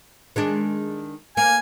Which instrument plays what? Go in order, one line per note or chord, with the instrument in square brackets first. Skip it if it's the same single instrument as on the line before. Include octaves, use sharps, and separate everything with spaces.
[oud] D#3 G#3 D4
[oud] A#3 [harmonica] G#5